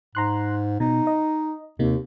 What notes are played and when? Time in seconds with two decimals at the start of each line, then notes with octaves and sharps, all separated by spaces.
0.15 G#2 A#5 C6 F#6
0.80 B2 D#4
1.07 D#5
1.79 D#2 C3 A#3 D#4